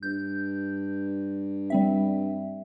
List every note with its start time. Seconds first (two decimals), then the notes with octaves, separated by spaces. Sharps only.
0.03 G2 G6
1.70 G3 C4 E5